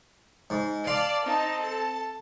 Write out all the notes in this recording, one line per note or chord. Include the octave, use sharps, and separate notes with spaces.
G#2
D5 F5 A5 C6
C4 D#4 A5
A4 A5